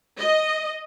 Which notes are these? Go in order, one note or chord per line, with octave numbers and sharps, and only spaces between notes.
D#5